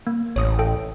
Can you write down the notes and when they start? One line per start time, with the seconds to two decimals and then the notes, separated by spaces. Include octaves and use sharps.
0.07 A#3
0.36 A1 C#5 D#6
0.59 A4 G5